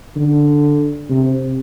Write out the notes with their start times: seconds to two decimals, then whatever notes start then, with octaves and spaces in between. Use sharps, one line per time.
0.17 D3
1.10 C3